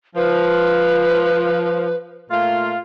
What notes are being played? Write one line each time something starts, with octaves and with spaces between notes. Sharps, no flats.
F3 B4
A#2 A3 F4